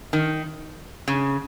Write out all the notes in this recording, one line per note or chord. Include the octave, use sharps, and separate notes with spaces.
D#3
C#3